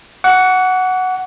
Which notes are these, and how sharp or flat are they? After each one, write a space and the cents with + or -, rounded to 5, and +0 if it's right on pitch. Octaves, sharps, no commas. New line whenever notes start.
F#5 +0 C#6 +45